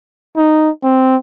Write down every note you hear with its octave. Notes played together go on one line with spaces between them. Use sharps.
D#4
C4